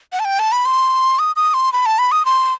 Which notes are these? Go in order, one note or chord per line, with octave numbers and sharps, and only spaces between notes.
F#5
A5
G5
A5
B5
C6
D#6
D#6
C6
B5
A5
B5
D#6
C6